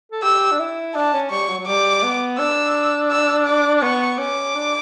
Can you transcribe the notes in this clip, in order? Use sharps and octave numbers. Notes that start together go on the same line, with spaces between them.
A4
G4 E6
D4
E4
D4 A5
C#4
G3 C#6
F#3
F#3
G3 D6
B3
D4 E6
E6
D6
B3 C#6
C#4 D6
D4